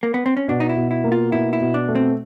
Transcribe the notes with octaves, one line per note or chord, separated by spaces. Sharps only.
A#3
B3
C4
C#4
B2 D4
D#4
E4
B2
E4
A#3
F4
B2 E4
E4
B2
D4
A3
C4